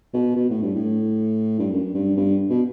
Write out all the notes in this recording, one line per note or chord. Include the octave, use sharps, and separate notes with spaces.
B2
B2
A2
G2
A2
G2
F#2
G2
G2
B2